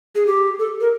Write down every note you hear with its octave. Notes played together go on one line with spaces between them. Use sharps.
G#4
G4
A4
A#4